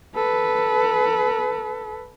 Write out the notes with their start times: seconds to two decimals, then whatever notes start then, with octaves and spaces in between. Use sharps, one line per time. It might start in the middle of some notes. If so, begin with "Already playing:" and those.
0.15 A4 B4